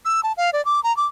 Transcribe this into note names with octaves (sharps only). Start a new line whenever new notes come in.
E6
A5
F5
D5
D6
A#5
D6